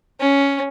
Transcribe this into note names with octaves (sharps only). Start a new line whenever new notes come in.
C#4